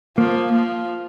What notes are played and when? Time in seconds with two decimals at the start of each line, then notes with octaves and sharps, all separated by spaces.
0.17 F3 A#3
0.52 F3